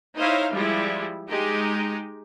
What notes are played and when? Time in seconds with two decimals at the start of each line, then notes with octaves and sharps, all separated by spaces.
0.17 D#4 E4 C5 C#5 F5
0.52 F3 G3 G#3 E4
1.29 G#3 D#4 G4